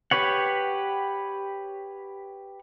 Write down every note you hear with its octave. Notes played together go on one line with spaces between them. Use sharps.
G4 B4 C#5 F#5